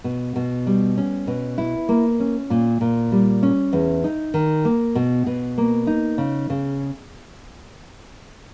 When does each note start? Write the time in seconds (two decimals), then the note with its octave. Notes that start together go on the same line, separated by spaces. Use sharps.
0.04 B2
0.36 B2
0.67 G3
0.97 C#4
1.27 B2
1.58 E4
1.89 A#3
2.20 C#4
2.50 A#2
2.81 A#2
3.12 G3
3.43 C#4
3.73 E2
4.04 D#4
4.34 D#3
4.65 A#3
4.95 B2
5.26 B2
5.58 A#3
5.87 D#4
6.18 C#3
6.50 C#3